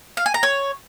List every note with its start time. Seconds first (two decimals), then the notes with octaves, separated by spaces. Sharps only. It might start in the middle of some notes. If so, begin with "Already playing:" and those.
0.17 F5
0.26 G#5
0.34 A#5
0.43 C#5